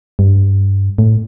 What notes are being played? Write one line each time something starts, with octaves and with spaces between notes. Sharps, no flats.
G2
A2